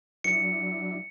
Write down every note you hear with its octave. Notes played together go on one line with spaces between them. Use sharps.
F#3 D4 E4 C#7